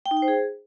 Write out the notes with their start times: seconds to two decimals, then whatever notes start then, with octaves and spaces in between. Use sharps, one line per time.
0.06 G5
0.11 D#4
0.17 G5
0.22 C5
0.28 G#4